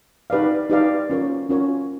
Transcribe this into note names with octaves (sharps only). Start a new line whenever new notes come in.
D#4 G4 B4 D5 F5
D#4 G4 B4 D5 F5
C#4 F4 A#4 C#5
C#4 F4 A#4 C#5